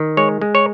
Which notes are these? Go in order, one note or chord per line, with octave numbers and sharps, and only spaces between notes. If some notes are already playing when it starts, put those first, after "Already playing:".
Already playing: D#3
G#3 C#5
G#3
C#5